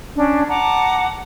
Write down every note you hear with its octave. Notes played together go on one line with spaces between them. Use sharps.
C#4 D4
F#5 A5 A#5 D6